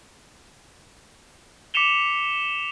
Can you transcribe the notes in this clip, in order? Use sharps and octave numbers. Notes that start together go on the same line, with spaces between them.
D6 B6 C#7 E7 F7 G7